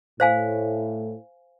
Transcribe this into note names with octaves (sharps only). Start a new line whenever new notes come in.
A2 C5 F5 G#5